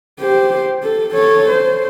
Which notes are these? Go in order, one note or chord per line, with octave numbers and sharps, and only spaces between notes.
G4 C5
A4
A4 C#5
C5